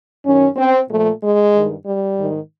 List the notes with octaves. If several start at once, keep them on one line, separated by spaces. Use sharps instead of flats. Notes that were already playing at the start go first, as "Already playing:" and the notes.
F#2 D#3 C#4
C4
A#2 F3 A3
G#3
G2 D#3
G3
G#2 D#3